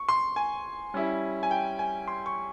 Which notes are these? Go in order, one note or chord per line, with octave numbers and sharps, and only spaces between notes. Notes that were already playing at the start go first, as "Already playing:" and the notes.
Already playing: C#6
C6
G#5
G3 C#4 E4
G#5
G5
G#5
C6
C#6